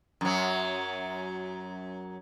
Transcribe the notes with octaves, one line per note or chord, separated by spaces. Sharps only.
F#2 F#3